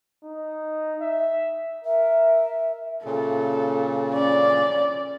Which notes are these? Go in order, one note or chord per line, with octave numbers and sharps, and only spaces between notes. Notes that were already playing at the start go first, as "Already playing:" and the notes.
D#4
E5
A#4 E5
A#2 C#3 A4
C#4 D5